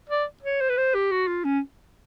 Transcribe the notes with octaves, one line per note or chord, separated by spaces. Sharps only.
D5
C#5
C5
B4
C5
G4
F#4
F4
C#4